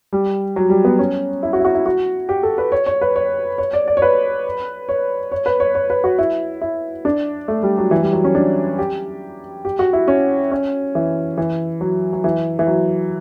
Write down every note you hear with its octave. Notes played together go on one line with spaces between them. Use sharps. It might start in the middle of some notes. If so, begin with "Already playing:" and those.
G3
F#3
G3
B3
C#4
E4
F#4
E4
F#4
E4
F#4
G4
A4
B4
C#5
C#5
B4
C#5
C#5
D5
D5
C#5
B4
C#5
C#5
B4
C#5
C#5
B4
F#4
E4
E4
D4
A3
G3
F#3
E3
G3
F#3
C#4
D4
G4
G4
F#4
E4
C#4
C#4
E3
E3
F#3
F#3
E3
E3
F#3